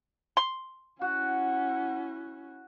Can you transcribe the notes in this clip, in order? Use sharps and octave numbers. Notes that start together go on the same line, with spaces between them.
C6
C#4 E4 F#4 F#5